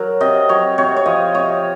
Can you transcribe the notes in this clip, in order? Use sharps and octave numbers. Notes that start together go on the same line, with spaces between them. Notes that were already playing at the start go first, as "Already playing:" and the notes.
Already playing: F#3 A#4
C3 D#5
F#3 C#5
C3 C#5
C#5
F3 D#5
C3 C#5